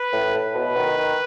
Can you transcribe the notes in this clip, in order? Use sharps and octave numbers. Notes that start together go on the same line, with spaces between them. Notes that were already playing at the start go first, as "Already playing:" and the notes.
Already playing: B4
A2
A2
B2 B4
D#3
D#3